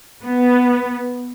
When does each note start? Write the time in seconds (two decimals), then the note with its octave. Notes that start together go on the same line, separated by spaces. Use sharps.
0.22 B3